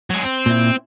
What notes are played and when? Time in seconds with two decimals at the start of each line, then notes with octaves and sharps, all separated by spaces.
0.10 F#3 G#3
0.23 C4
0.46 A#2 E4